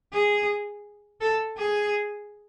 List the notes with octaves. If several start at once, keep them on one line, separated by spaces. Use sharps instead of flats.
G#4
A4
G#4